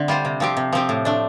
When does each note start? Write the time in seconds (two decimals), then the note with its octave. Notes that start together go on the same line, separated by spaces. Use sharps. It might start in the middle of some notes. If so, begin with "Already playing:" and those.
Already playing: D3 A3 C4
0.08 G3 F4 C5
0.25 C3
0.40 F3 C4 G4
0.57 C3
0.73 F3 C4 G4
0.89 A2
1.05 A3 D4